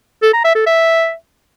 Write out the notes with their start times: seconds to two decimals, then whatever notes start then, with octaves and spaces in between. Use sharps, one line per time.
0.23 A4
0.34 A#5
0.45 E5
0.55 A4
0.66 E5